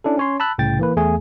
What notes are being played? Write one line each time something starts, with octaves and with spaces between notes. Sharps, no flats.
C#4 D4 E4 A4
C#4 C#5 C6
A5 B5 E6 F#6
C2 A2 C#3 G5 A6
E3 A#3 B4
E2 A3 G#4 G#5